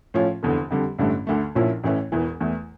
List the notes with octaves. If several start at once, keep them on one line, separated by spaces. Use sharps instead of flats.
A2 F3 C#4 F4
F1 E2 D3
F2 D3 G3
A1 G2 D3 A3
D2 D3 A3
A#1 A#2 F3 C#4 E4
A1 A2 E3 A3 C#4
E1 E2 E3
E2 E3 A3